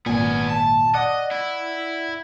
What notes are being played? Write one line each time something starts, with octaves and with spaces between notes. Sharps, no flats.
G#1 A#2 B3 G#5
A5
D5 D#5 F#5
E4